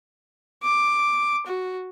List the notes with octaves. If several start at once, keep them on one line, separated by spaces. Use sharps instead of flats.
D6
F#4